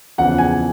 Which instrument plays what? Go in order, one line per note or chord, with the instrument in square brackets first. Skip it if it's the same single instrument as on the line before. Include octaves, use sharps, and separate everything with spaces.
[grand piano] E2 C#3 F3 F#5
G#5